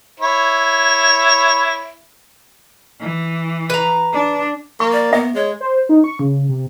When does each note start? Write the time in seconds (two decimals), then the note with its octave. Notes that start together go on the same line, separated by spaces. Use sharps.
0.20 E4 C#5
3.01 E3
3.70 B4 A#5
4.13 D4
4.80 A#3 C#6
4.92 D5
5.13 B3 E5
5.35 G#3 C#5
5.61 C5
5.89 D#4
6.04 C#6
6.19 C#3
6.49 C3